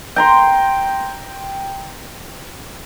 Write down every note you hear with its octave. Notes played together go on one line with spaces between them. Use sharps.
G5 A#5 C6